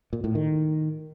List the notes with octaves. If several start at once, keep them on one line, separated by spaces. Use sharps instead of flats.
A#2
A2
D#3